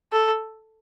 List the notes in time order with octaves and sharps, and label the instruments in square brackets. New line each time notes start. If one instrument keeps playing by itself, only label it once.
[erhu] A4